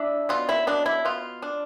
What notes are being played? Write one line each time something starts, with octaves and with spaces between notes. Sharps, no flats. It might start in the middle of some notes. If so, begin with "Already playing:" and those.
Already playing: D4 E4
B2 F4
E4
B2 D4
E4
B2 F4
D4